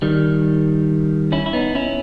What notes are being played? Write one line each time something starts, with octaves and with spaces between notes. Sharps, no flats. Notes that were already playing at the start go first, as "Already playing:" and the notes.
D#3 G3
C#4 E4
E4
B3 D#4
C#4 E4